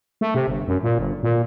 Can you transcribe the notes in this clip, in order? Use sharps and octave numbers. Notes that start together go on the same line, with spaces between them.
A3
C3
G1
F#2
A#2
G1
A#2